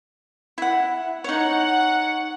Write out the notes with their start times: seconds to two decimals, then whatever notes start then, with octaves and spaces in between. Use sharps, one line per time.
0.58 E4 F#5
1.24 D#4 C#5 F#5